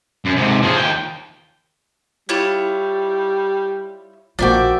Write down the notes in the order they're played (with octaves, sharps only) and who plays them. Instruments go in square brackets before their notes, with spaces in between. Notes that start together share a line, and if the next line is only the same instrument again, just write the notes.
[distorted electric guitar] F#2
G#2 C3
F3 G#4
D#2 G5
[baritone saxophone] G3 [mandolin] E4 F4 C#5
[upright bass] A#1 [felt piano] F3 A#3 F#4 [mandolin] D5 E5 G5